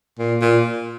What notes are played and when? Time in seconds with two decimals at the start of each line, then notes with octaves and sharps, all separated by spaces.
0.19 A#2
0.41 A#2